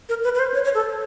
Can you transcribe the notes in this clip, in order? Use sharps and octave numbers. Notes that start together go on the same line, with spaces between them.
A#4
B4
B4
C5
C#5
C#5
A4